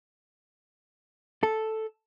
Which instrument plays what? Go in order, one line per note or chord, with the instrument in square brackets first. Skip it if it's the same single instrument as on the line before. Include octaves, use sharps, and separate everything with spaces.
[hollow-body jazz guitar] A4